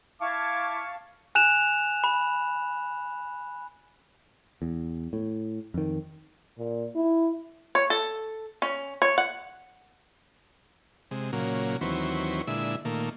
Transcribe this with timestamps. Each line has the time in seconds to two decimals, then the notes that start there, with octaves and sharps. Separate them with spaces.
0.21 E4 F5 A5 C#6 D6 G#6
1.35 G#5 F#6 E7 F7
2.04 B5
4.62 E2
5.13 A2
5.74 F2 D#3
6.58 A#2
6.96 E4
7.75 C#5
7.90 A4
8.62 C#4
9.02 C#5
9.18 F#5
11.11 C3 G#3
11.33 A#2 C#3 F#3 A#3
11.81 D#2 E3 F#3 C4 B4 C#6
12.47 A#2 D3 G#3 E4 E5
12.85 A#2 D#3 A3 A#3